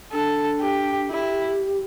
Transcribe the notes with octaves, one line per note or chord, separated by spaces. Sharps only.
D4 A4
G4
E4 G4